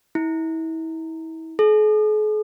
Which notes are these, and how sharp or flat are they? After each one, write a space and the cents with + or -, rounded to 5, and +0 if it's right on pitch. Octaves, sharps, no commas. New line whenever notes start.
E4 -35
G#4 +45